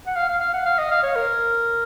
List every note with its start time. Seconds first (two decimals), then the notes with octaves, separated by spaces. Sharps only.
0.07 F#5
0.16 F5
0.29 F5
0.41 F5
0.53 F#5
0.66 F5
0.79 D#5
0.91 F5
1.03 C#5
1.16 A#4